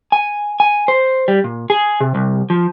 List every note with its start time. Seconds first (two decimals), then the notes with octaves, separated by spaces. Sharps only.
0.12 G#5
0.60 G#5
0.88 C5
1.28 G3
1.44 A#2
1.70 G#4
2.00 C3
2.15 C2
2.50 F3